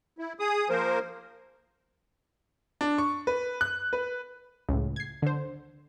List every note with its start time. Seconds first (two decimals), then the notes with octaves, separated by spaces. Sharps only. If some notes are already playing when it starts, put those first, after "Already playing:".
0.18 E4
0.40 G#4 D#6
0.70 F3 A#3 A#4 C5
2.81 D4
2.98 C#6
3.27 B4
3.61 F#6
3.93 B4
4.69 C#2 A2
4.96 G#6 C7
5.22 D3 C5